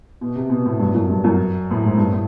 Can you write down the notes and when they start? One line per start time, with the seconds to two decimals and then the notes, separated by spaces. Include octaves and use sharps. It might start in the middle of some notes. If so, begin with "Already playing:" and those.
0.21 B2
0.35 C3
0.49 B2
0.65 A2
0.79 G2
0.94 F#2
1.09 G2
1.24 F#2
1.71 A2
1.83 G#2
1.98 G2
2.12 A2